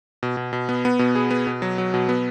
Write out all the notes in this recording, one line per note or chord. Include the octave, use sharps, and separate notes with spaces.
B2
B2
B2
B3
B3
B2
G#4
B3
B2
F#3
F#3
B2
B3